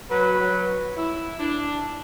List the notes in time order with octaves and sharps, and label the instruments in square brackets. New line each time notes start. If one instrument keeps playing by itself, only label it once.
[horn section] F#3 [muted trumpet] B4
[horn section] F#3
E4
D4